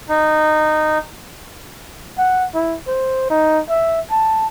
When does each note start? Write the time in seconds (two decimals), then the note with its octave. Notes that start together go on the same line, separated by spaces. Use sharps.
0.09 D#4
2.18 F#5
2.54 E4
2.87 C5
3.30 D#4
3.70 E5
4.11 A5